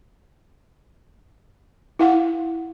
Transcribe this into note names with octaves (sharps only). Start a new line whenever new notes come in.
E4 F5 F#5